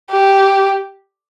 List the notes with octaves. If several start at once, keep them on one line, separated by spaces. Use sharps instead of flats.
G4